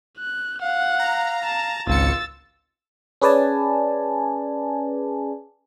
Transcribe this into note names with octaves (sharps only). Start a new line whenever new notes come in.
F#6
F5 F#5
A#5
A5
G#1 C#2 F4 E6 A6 C#7
C#4 G#4 B4 D5 G#5 A5